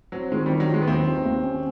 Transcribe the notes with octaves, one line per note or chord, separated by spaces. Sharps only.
F#3 C4
D#3 G#3
D#3 G3
F#3
D#3 G#3
B3
D#2 C4
D#3
D#2
C#4